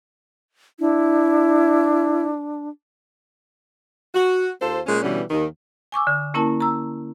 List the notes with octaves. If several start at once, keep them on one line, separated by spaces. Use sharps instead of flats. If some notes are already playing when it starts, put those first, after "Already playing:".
D4 E4
F#4
D#2 F4 A4 C5
A#2 G#3 C#4
B2 D3 E3 G3 C#4
D#2 D#3
G#5 C#6 D6 E6
D3
A#3 C#4 E4 A#4 A5
A#5 E6